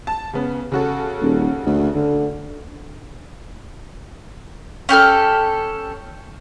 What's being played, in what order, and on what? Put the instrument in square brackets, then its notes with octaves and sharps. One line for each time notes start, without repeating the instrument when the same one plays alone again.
[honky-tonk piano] A5
C#3 B3
C#3 F#4 A4
[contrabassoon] D#1
D2
D3
[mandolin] C#4 G4 A4 F6